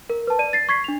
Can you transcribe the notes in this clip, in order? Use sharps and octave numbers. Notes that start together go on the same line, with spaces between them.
A#4
B4 A5
D5 D#7
A6 C7
C#6 G#6 B6 C7
D4 F7